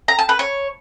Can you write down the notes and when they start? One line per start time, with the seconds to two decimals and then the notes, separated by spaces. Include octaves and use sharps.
0.08 A#5
0.19 A5
0.29 B4
0.39 C#5